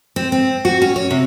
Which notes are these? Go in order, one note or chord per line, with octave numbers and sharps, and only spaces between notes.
C4
C4
F#4
C#4
C#5
C3